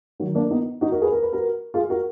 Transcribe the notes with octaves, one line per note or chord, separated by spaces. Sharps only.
D#3 F#3
A#3 D4
B3 D#4
D#4 F#4
F#4 A#4
G#4 B4
A#4
B4
F#4 A#4
F4 G#4
F#4 A#4